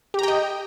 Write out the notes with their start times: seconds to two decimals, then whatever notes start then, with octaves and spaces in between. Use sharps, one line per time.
0.14 G4
0.19 A#5
0.23 G5
0.28 D#5